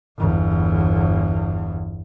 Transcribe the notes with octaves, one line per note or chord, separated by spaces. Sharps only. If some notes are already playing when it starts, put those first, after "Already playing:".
G1 E2